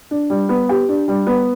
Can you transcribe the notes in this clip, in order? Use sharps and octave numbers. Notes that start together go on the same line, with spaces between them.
D4
G3
B3
G4
D4
G3
B3